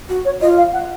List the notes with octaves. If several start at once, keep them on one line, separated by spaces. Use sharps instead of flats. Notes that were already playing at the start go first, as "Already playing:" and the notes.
F#4
C#5
F4 D#5
F5
F#5